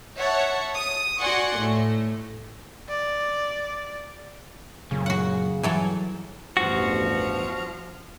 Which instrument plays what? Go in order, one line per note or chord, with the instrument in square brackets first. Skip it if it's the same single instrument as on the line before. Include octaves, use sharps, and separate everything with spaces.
[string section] C#5 E5 F#5 A5
D#6
F#4 D5 F#5 G#5 C6 C#6
A2 A3
[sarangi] D5
[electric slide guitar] F#2 A#2 [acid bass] C#3
[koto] F#4 F#5
[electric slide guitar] G2 G#4 [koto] E3 F#3 A4
[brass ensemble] A1 E2 G2 [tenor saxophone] F3 [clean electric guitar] F#4